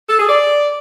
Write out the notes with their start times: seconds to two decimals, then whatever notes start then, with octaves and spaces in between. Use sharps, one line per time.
0.09 A4
0.19 G#4
0.29 D5